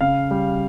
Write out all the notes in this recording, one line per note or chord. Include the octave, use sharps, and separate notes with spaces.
C#3 F5
G3